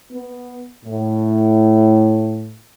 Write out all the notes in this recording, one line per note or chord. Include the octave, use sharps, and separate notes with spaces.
B3
A2